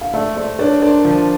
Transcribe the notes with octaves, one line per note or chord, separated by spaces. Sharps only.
F5
A3 D5 E5
A3 C5 D5
D4 B4 C#5
D4 A#4 C5
F3